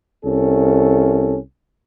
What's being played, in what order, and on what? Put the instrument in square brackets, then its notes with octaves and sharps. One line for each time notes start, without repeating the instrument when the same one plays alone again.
[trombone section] C2 C#4 A4